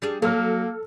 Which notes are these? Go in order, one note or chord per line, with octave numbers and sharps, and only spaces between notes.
G3 D4 G#4
F#3 A#3 A4 F6